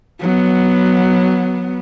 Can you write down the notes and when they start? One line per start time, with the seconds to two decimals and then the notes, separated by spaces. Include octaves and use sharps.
0.21 F#3 B3